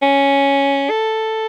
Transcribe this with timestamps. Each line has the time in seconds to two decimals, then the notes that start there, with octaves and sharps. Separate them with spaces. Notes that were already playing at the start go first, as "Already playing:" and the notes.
0.02 C#4
0.90 A4